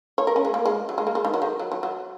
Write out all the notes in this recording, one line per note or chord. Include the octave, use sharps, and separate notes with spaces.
C#5
A#4
C#4
G#3
A#3
G#3
F#3
G#3
A#3
G#3
D#3
F#3
D#3
F#3
F#3
F#3